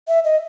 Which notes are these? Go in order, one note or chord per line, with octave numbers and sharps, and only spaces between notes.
E5
D#5